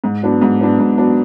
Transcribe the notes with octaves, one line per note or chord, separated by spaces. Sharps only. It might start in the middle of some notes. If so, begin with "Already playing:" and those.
G#2
F#3 B3 D4
G#2
F#3 B3 D4
G#2
F#3 B3 D4